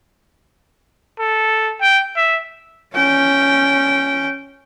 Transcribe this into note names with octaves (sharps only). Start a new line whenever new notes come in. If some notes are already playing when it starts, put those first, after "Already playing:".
A4
G5
E5
C#4 G5